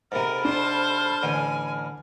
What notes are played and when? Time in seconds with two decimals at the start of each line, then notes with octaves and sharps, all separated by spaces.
0.12 G#2 C3 A4 A#4 B5 F6
0.45 D4 C5 A5
1.23 A1 D3 G#5